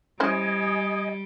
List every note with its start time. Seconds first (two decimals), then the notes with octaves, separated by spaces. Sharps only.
0.20 G3 C#4 E4 C5 D#5 G#5